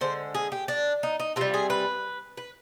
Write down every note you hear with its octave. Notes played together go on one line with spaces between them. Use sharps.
D3 G#3 C5
G#4
G4
D4
D#4
D#4
C3 G3 F4
G#4
B4
B4